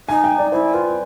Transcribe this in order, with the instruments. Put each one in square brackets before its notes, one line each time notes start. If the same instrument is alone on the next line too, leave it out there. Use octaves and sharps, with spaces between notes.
[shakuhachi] D#4 [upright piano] G#5
[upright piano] G5
D5
[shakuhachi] E4 [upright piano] C5
[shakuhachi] F4 [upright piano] B4